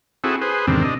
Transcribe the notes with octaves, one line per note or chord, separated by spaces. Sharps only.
C4 E4 F#4 G#4 A4
G#4 B4 C5
E2 G#2 C3 D#3 C4 D4
C3 D4 D#5